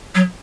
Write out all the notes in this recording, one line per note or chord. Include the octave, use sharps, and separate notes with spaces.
F#3